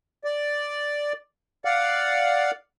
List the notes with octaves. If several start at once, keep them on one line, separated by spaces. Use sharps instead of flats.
D5
D5 F5 F#5